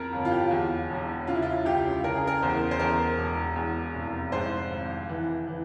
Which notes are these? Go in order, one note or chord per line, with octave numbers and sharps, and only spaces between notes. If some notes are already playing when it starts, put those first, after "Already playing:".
Already playing: F2 A#4
G1
F4
G4
E2
E1
C#3 F4
E4
F4
C#2 G4
C#3 A#4
G#4
A#4
E2 C5
C5
E2 A#4
E1
E2
F1
G#2 C5
G#1
E3
E3